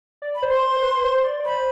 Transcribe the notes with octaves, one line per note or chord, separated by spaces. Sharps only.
D5
B5
C5
C6
C5
C5
B4
C5
D5
D5
C5 B5